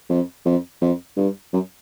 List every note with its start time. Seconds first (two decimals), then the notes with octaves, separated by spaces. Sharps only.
0.09 F2
0.46 F2
0.81 F2
1.17 G2
1.53 F#2